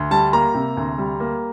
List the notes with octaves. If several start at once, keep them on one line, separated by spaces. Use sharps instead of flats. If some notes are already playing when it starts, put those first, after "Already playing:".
Already playing: D2
G3 A5
A#3 A#5
C3
D2
G3
A#3